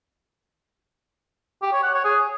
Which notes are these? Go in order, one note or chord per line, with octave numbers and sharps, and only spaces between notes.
G4
C#5
F#5
C#5
G#4